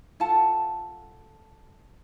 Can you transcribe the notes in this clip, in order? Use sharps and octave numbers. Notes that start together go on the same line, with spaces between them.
F4 A4 F#5 A5